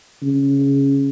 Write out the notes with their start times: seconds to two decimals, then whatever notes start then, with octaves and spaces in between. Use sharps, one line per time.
0.23 C#3